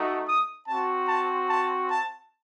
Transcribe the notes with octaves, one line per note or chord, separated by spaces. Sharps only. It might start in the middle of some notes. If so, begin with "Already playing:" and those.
Already playing: A3 D#4 F#4
D#6
C4 F#4 A5
A5
A5
A5